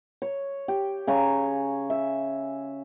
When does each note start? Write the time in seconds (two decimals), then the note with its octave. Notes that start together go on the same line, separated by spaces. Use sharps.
0.22 C#5
0.68 G4
1.07 C#3 G#5 A#5 C#6
1.90 E5